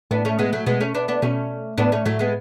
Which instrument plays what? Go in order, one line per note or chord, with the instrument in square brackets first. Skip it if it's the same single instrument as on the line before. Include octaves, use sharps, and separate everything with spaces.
[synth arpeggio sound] A2 [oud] B3 D4
[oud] A3 C#4
G#3 B3
F#3 A3
[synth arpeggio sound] B2 [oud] G#3 B3
[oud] A3 C#4
B3 D4
B3 D4
[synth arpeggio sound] B2 [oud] A3 C#4
[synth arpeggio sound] A2 [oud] B3 D4
[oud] A3 C#4
[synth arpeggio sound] A2 [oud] F#3 A3
[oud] G#3 B3